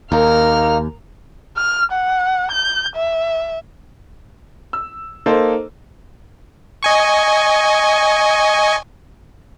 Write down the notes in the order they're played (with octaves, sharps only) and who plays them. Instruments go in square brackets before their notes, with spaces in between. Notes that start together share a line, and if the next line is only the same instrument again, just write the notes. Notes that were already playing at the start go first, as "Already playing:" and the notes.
[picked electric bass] D#2 [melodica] A#3 D#4 [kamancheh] A#4 F6
[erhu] F6
F#5
G6
E5
[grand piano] E6
A#3 D#4 A4 C5
[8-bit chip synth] D#5 G#5 C#6